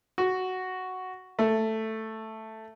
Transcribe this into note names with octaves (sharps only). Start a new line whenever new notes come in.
F#4
A3